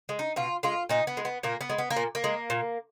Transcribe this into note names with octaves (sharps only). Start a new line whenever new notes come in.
G#3
D#4
B2 F4
G#3 F4
A#2 D#4
B3
G#3
B3
A#2 A#3
B3
G#3
B3
A#3
A#2
A#3
G#3
A#2